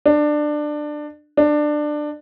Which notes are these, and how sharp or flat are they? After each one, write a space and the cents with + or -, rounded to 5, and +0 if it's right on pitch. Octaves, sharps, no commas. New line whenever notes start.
D4 +20
D4 +20